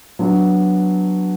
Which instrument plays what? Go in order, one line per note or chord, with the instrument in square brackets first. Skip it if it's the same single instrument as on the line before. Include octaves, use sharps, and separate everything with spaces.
[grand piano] F#3 B3 D4